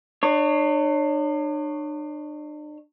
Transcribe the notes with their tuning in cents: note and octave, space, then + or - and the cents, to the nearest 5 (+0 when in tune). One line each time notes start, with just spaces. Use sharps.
D4 +40 C#5 +0